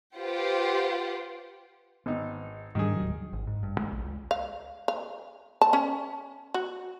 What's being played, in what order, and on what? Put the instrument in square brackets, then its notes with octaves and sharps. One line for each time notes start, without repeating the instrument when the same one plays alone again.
[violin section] F4 G4 B4 C5 F#5 G5
[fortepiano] G#1 D#4 [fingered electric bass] B3
[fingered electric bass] G#2 G3 D4 [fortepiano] D#3 G#4
[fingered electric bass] D1 F#3
[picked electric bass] G#1
G#2
G2
G#3
A#1
C#2
[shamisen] F5
F5
A5
C#4
F#4